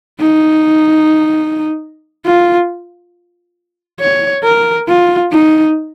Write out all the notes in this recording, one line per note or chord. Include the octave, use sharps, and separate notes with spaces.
D#4
F4
C#5
A#4
F4
D#4